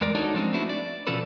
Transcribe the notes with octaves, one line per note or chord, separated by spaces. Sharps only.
E2 G#3 A#4 D5
D4 D#4 F#4 A4 C#5 D5
F3 G#3 C4 C#4 D#4
A3 B3 D4 E4 F#4
D5
B2 F3 C#4 F4 A4 B4